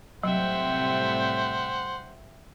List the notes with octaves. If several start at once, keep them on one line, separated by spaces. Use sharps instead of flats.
A2 C3 F#3 G3 C5 E5 F#5 G5